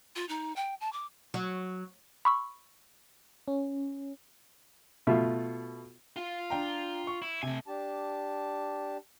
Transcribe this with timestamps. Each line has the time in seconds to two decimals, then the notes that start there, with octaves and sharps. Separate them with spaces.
0.16 F4
0.29 D#4
0.56 G5
0.81 A5
0.93 D6
1.34 F#3
2.25 B5 C#6 E6
3.48 C#4
5.07 B2 A3 F4 E5
6.16 F4
6.50 D4 G5 A#5
7.07 C#6
7.22 E4
7.43 C3 A3 G#5
7.66 D4 G4 A5